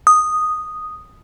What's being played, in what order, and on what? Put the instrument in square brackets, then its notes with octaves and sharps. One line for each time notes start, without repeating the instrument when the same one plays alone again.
[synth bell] D#6